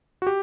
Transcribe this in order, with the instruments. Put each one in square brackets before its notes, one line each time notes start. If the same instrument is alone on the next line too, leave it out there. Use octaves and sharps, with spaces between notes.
[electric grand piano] F#4
G4